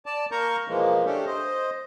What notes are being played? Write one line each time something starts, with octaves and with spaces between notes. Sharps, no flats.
D5 A5
A#3 A#4 A#5 C#6 G6
B2 E3 F3 G#3 A#3
A3 C#4 D4 G4 A4
C5 D#5